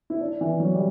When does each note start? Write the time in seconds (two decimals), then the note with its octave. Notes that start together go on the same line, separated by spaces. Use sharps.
0.10 E4
0.21 D4
0.41 E3
0.60 F#3
0.74 G3